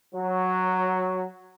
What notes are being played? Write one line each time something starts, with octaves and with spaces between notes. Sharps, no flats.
F#3